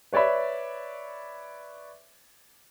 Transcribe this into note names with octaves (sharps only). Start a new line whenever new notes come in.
B4 C#5 D5 E5 B5